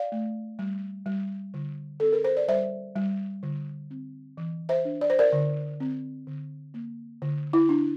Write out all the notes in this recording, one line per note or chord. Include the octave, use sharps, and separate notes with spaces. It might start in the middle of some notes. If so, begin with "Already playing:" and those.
Already playing: D5 F5
A3
G3
G3
D3
C4 A4
A#4
C5
D5
G3 C5 E5
G3
D3
C4
E3
C5 E5
D4
D5
C5
A#4 D5
D3
C4
D3
A#3
D3
E4
D4